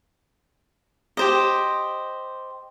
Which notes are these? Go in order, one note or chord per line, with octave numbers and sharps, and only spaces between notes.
G4 C5 D#5